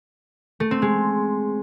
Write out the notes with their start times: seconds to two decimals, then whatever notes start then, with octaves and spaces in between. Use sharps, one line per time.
0.60 A3
0.71 C4
0.82 G#3